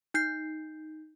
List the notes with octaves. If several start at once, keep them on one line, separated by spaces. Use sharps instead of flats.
D#4 G6 C7